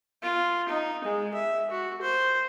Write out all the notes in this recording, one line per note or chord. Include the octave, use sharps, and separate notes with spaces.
F4
D#4
G#3
E5
F#4
C5